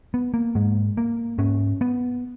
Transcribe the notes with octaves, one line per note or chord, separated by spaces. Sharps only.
B3
A#3
G#2 G#3
A#3
G#2 C#4
B3